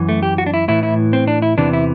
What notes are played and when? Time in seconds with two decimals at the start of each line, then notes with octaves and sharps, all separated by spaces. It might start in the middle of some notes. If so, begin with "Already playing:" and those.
Already playing: F#2 E3
0.09 A3
0.23 G4
0.38 F#4
0.46 D4
0.54 E4
0.68 A2 E3 E4
0.83 E4
1.13 C4
1.28 D4
1.42 E4
1.57 E2 C3 E3 D4
1.73 E4